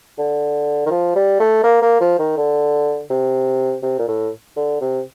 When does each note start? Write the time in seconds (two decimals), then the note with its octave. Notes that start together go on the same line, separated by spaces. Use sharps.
0.18 D3
0.86 D#3
0.90 F3
1.15 G3
1.40 A3
1.63 A#3
1.82 A#3
2.00 F3
2.19 D#3
2.37 D3
3.10 C3
3.83 C3
3.99 A#2
4.07 A2
4.56 D3
4.81 C3